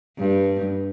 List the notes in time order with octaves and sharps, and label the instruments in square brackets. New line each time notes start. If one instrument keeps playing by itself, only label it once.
[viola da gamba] G2